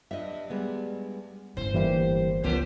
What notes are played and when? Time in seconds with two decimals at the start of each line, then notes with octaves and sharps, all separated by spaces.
0.11 G2 D#5 E5
0.50 G3 G#3 B3
1.57 G1 A2 C#4 C5
1.74 E3 G3 A#3 G4
2.44 C#2 E3 F3 A#3 B3 G4 C5